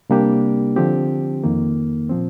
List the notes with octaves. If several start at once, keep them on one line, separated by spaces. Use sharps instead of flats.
C3 G3 A#3 D4 G4
D3 F3 C4 G4
F2 D#3 A#3
A#2 F3 C4